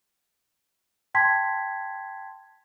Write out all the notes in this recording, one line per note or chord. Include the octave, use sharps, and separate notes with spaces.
G5 A5 C6 G#6 B6